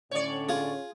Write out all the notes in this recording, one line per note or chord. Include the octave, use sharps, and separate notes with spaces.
A2 D3 C#4 C#5 D5
F4 G#4